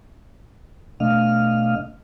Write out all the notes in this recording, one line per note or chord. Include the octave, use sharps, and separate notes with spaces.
B2 A3 D4 D#5 F5 F6